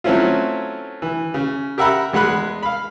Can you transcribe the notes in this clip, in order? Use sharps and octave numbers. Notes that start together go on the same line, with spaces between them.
F#3 A3 C4 C#4 E4 F4
E3
C#3
G4 A#4 E5 F#5 A#5 B5
E2 G#3 F#5 B5 F#6
F5 B5